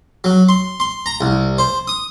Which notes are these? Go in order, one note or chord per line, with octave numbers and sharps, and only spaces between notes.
F#3
C6
C6
A#5
C2
C5
D#6